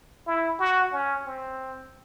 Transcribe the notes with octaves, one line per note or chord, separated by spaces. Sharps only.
E4
F#4
C#4
C4